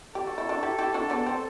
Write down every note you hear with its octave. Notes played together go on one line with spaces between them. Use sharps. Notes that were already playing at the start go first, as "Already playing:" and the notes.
G4 A4
F#4
E4
D4 F#4
E4 G4
E4 G4
D4 F#4
B3 D4
C4